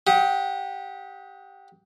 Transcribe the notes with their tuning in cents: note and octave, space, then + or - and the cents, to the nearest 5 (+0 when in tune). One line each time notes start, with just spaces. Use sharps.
G4 +0 F#5 -20 D#6 +25